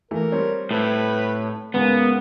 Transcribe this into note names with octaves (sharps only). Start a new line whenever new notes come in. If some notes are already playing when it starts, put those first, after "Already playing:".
E3 A3 A#3 A#4
G3 C4 C#5
A2 B4
G#2 C#3 G#3 A#3 B3